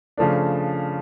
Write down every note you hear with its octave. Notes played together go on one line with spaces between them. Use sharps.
C#3 F3 A3 D4